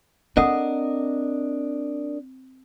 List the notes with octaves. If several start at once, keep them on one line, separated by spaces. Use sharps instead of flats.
C4 D4 A4 A#4 D#5 F#5 D#6